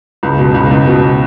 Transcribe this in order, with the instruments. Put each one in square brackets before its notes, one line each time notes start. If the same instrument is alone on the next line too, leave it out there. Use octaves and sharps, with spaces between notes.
[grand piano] C#2
B2
C#2
C#2
B2